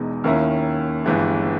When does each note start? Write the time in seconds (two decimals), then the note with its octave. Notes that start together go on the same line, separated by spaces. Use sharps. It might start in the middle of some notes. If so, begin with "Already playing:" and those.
Already playing: E1 E2 B2 G#3 D#4
0.24 D#2 D#3 A#3 C#4 E4
1.05 G1 G2 E3 G#3